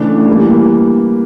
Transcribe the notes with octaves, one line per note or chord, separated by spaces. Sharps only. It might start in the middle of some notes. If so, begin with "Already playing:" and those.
Already playing: C#3 E3 A3 D4
E3 G3 A#3